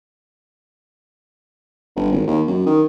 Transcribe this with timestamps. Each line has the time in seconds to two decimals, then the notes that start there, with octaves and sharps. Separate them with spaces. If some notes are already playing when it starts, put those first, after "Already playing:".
1.96 G1
2.12 G#1
2.27 D#2
2.48 F#2
2.66 D#3